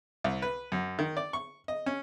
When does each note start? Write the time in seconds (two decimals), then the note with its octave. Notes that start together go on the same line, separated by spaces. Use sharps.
0.24 C2
0.42 B4
0.72 F#2
0.99 D#3
1.17 D5
1.33 C#6
1.68 D#5
1.86 C#4